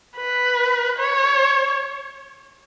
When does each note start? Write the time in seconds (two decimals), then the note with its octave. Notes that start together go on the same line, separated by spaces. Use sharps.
0.17 B4
0.99 C#5